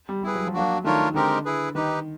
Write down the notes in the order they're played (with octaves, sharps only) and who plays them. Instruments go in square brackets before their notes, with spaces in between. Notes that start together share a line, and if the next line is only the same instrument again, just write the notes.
[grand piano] G3
[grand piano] G3 [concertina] E4 G#4 B4
[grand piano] F#3
F3
[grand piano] F#3 [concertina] A#3 D4 F#4
[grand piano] D#3 [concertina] A3 D4 F4 A#4 C#5
[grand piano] D3 [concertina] G#3 C4 D#4 G4 A#4
[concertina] E4 G#4 B4
[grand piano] D#3 [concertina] D#4 G4 B4